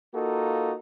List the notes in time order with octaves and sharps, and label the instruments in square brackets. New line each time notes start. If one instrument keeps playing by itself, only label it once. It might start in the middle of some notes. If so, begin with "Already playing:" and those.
[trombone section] A#3 D#4 F4 F#4 A4